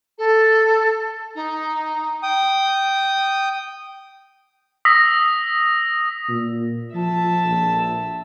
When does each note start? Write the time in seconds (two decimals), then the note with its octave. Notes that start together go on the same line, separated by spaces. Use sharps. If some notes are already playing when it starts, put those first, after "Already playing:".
0.18 A4
1.35 D#4
2.23 G5 D#6
4.85 D#6 E6 A#6 B6
6.29 A#2
6.94 F3 E5 A5
7.46 A#1